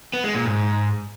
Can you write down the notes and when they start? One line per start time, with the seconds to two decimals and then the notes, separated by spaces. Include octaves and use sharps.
0.13 B3
0.24 G#3
0.35 A#2
0.45 G#2